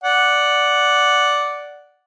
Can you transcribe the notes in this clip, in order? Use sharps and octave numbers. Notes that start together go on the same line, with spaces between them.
D5 F#5